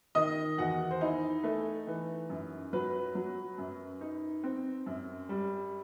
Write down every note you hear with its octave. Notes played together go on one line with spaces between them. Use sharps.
D#3 D#5 D#6
E2 F#4 F#5
C5
D#4 E4 D#5
A3
E3
F#2
F#3 B4
F#3
F#2
D#4
C4
F#2
G3